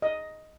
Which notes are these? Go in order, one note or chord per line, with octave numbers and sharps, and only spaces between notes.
D#5